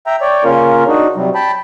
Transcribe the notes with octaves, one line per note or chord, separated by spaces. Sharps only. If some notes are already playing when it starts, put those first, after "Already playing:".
E5 G5 A#5
C#5 D5 G5
C#3 A#3 C#4 F4 A#4
D4 D#4 F#4
C3 F#3 G3
G5 A5 B5